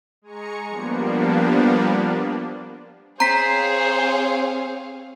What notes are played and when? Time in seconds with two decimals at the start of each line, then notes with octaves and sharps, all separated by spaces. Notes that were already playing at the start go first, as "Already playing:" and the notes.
0.22 G#3 G#5 A#5 C#6 C#7
0.68 F3 G3 A#3 B3 D4
3.20 C4 G#4 C5 C#5 F5 A#5 B6